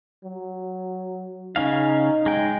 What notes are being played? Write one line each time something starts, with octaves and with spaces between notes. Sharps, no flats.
F#3
C#3 C#4 D#4 F5
G#3 G5